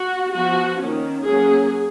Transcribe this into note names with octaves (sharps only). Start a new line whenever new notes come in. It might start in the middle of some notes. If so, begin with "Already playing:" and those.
Already playing: F#4
F3 B3 F#4
D#3 A#3 C#4
F#3 A#3 C#4 G#4